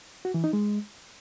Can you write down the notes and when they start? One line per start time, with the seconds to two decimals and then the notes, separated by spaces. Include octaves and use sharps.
0.25 F#4
0.34 E3
0.44 D#4
0.53 G#3